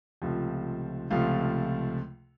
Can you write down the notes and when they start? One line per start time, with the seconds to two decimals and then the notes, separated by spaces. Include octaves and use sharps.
0.22 C#2 C3 F3 A3
1.10 C#2 C3 F3 A3 F5